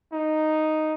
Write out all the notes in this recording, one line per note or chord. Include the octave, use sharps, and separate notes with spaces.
D#4